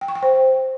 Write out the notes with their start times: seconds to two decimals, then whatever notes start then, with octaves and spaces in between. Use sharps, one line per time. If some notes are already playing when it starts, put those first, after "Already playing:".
0.01 G5
0.08 C#6
0.15 G5
0.22 C5